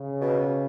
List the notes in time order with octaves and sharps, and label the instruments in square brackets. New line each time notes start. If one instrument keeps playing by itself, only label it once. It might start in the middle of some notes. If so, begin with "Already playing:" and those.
Already playing: [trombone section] C#3
[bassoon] B2